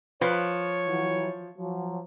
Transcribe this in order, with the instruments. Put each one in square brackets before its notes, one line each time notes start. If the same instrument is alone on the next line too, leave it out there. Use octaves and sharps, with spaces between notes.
[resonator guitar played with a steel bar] F3 [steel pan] B4 [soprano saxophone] C#5
[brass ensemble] E3 F#3
F3 F#3